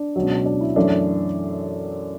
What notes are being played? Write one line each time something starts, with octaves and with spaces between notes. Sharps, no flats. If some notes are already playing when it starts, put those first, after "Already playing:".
Already playing: D4
C#2 B2 F#3
D4
E4
F#2 E3 A3 C#4 D4